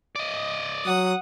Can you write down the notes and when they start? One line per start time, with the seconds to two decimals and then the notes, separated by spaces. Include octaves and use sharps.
0.16 D5 D#5
0.86 F#3 F#5 D#6